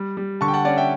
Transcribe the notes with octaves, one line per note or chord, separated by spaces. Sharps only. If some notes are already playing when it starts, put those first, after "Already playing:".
Already playing: G3
G3
D3 A5 C#6
G5
F#5 A5
C#4 D5 F#5
E5 G5